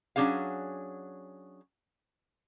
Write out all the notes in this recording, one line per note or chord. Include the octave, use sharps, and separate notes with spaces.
F#3 C#4 D4 G#4 F5